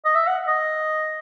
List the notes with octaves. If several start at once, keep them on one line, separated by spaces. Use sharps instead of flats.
D#5
E5
F#5
D#5